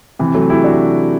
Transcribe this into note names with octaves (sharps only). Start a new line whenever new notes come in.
C3 E3
F#3 A3
E4 G4
D4 F#4